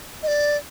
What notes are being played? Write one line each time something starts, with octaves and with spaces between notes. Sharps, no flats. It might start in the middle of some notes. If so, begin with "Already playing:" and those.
D#5
D5